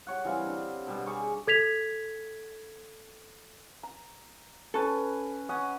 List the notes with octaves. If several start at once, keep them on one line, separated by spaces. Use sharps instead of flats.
G4 C#5 F#5
E3 G3 C4 F5
D3
B2 G3
G#4 A#4 C#6 D6
A4 G#6 B6 F7
A#5
C#4 A4 B4 A5
C#4 D#5 F#5